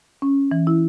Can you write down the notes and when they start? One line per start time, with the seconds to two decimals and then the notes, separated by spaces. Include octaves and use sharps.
0.22 C#4
0.51 E3
0.67 E4